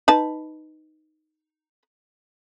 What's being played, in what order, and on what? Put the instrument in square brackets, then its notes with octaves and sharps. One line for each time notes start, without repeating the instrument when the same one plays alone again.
[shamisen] D#4 B4 A5